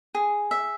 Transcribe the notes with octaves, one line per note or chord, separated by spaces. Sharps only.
G#4
E5